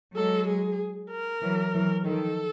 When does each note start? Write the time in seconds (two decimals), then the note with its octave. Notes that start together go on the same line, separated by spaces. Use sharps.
0.16 F#3 G#3 A4
0.48 G#4
1.11 A#4
1.43 E3 F#3
1.74 E3 F#3
2.06 D#3 F3 A4